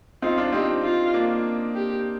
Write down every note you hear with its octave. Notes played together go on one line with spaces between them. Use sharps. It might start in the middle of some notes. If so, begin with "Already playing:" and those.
C4 D#4 F4
D4 F4
C4 D#4 G4
F4
A#3 D4
G4